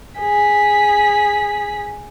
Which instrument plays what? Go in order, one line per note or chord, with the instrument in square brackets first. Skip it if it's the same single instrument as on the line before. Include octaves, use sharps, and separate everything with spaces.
[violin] G#4 B6